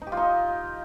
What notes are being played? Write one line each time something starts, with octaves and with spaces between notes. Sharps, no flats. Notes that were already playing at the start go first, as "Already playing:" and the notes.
D#4
G4
F4
D#4